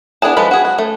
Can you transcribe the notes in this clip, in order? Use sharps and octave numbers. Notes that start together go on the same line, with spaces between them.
B3 D4 E4 G#4 A5
F3 G#3 A4 B4 B5
F#4 G#4
F#4
A3